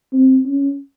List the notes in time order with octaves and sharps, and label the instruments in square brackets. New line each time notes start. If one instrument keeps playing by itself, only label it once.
[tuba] C4
C#4